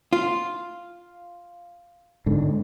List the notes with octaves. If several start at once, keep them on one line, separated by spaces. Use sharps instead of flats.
F4
G#2 D3